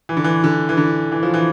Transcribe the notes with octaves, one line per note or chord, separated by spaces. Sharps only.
E3
D3
E3
D3
E3
D3
E3
F3
E3